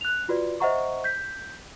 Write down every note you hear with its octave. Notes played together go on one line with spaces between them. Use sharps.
F#6 F7
F4 F#4 B4 D5
C5 D#5 E5 F#5 A#5 C#6
G6 B6